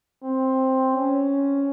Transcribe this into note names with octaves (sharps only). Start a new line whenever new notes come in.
C4
C#4